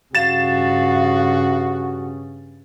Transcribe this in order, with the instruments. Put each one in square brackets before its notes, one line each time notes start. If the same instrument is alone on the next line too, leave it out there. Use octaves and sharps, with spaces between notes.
[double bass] G2 C#3 [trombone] F#4 [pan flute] F5 [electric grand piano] A6 E7